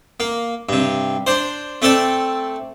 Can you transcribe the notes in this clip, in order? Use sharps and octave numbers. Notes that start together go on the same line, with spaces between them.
A#3
G2 C3
D4 C5
A3 C4 A4 D5 A5